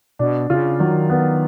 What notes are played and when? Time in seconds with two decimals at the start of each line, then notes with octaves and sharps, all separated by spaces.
0.19 B2 D4
0.50 C#3 F4
0.80 D#3 F#3
1.10 B3